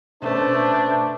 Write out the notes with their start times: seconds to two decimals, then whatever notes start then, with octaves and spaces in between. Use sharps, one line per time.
0.22 B2 A3 C#4 D4 B4 C5